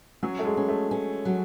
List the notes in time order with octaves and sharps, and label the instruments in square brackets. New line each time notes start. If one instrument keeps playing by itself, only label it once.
[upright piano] F#3 [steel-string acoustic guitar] C#4
[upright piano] A3
G#3
[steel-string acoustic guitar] C#4
[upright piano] A3
[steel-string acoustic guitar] C#4
F#3